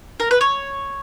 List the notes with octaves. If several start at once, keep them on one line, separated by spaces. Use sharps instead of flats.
A#4
B4
C#5